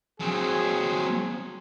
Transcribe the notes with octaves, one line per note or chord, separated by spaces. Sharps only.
F#3 C4 G#4